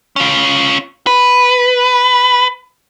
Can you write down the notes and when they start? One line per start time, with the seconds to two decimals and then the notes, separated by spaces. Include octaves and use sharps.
0.16 C#4 F4
1.07 B4